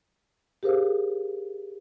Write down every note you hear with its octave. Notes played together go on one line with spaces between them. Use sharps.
G4 G#4 A#4 C5 F5